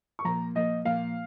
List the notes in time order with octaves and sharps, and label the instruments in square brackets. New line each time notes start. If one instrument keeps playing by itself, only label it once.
[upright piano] C#6
[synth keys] A#2 F3 A#3 [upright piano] A#5
[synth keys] A#2 F3 A#3 [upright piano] D#5
[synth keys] A#2 F3 A#3 [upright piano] F5